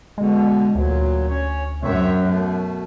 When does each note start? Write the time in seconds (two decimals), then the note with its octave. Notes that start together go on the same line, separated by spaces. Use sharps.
0.18 B2 D3 G#3
0.75 D2 A#2 F#3
1.28 C#4 C#5
1.83 F#2 C4 C#5 E5
2.23 B2 A3